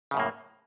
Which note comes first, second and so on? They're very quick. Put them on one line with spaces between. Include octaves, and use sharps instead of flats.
C#3 F#2 A2 A#3